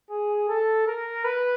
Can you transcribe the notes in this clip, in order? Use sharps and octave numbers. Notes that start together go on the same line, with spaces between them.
G#4
A4
A#4
B4